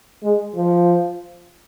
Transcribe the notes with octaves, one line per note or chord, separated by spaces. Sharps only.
G#3
F3